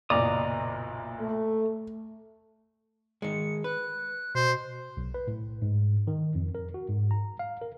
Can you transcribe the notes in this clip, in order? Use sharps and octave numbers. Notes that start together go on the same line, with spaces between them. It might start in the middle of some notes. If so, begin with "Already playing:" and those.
F#1 B1 A#2 D5 D#5 A#5 D#6
A3
D#3 G#3 C#7
B4 F#6
B2 C5
B1
B4
A2
G#2
D#3
F2
A#4
F#4
G#2
A#5
F5
A#4